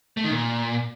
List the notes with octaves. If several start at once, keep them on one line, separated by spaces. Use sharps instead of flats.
A3
D#3
A#2